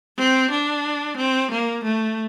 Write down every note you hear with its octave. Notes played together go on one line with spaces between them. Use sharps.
C4
D4
C4
A#3
A3